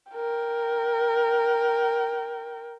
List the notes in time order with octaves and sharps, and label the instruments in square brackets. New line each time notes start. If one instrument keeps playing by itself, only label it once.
[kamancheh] A#4 G5